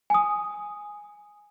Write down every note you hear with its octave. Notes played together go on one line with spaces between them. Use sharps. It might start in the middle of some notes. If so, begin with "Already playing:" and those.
G#5 D#6